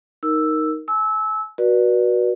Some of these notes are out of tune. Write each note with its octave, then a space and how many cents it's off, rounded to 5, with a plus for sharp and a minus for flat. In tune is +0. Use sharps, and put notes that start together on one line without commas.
D#4 +0 A#4 +0 E6 +0
G#5 +40 E6 -20
F#4 +0 B4 -35 D5 +20